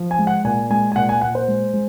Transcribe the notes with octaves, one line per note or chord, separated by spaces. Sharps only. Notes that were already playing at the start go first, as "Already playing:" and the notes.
Already playing: F3
G#5
G#3
F#5
A#2 G#5
G#3 G#5
G#5
A#2 F#5
G#5
A#2 F#5
C5
G#3
G#3